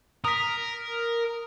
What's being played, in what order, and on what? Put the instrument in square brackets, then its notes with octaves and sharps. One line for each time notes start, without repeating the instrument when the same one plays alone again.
[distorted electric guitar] A#4 [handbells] D#6 B6